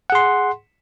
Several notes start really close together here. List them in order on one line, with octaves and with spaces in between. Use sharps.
F#5 G#4 C6